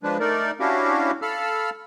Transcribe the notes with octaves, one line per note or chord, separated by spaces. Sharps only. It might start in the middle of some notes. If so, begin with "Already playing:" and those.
F3 G#3 D4 B4
A3 D#4 A#4 D5
C#4 D4 E4 F#4 G4 F5
A4 F5 A5 B5 E6 F6